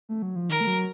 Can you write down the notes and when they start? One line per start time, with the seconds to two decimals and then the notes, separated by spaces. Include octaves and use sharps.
0.09 A3
0.22 F#3
0.36 F3
0.50 D#3 A#4
0.61 A3
0.67 F#3